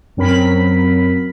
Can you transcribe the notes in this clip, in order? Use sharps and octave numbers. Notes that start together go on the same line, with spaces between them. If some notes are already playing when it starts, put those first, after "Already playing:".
F#2 F#3 C4 A#4 B5 B6